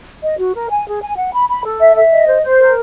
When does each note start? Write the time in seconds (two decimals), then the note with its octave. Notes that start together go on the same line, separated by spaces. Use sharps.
0.22 D#5
0.38 F#4
0.54 A#4
0.69 G#5
0.86 G#4
1.01 G#5
1.17 F#5
1.33 B5
1.49 B5
1.64 A4
1.80 E5
1.96 E5
2.11 D#5
2.27 C5
2.43 C5
2.59 A#4